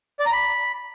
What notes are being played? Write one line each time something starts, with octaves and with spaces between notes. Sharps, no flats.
D5
A#5
B5